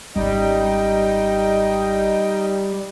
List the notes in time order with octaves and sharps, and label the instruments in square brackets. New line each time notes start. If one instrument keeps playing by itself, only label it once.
[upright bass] G#1 C#4 [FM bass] G3 [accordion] D#4 D#5 G5